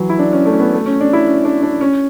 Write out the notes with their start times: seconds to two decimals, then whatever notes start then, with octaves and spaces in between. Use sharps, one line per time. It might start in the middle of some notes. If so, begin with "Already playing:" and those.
Already playing: E3 F#3
0.09 E4
0.19 D4
0.33 C#4
0.46 A3
0.53 C#4
0.60 B3
0.73 A3
0.86 C#4
1.01 D4
1.13 E4
1.27 C#4
1.45 D4
1.62 D4
1.81 C#4